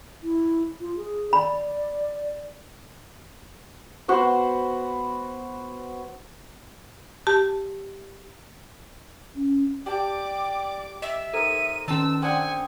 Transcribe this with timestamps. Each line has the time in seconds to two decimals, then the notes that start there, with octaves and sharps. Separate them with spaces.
0.23 E4
0.81 F4
0.97 G#4
1.33 D5 B5
4.08 B3 F#4 C5 B5
7.27 G4 A5
9.36 C#4
9.86 G4 D5 A5 D6
11.02 D#5 E5
11.34 D#4 A4 A#4 C5 D#7
11.88 D#3 C#4 A5 E6
12.22 C4 D4 F#5 G#5 D#6